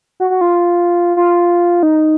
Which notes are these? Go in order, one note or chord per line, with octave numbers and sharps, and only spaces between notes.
F#4
F#4
F4
F4
D#4